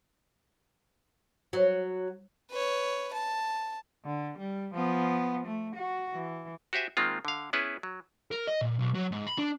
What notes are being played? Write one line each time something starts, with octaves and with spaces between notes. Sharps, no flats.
F#3
B4 C#5
A5
D3
G3
F3 B3
A3
F#4
E3
F#4 G4 C5 E5 G#5
D#3 G#3 A#3 C4 F4
D3 F5
B3 C#4 E4 G#4 B4
F#3
A#4
D#5
A#2
B1
F#3
G#2
B5
D4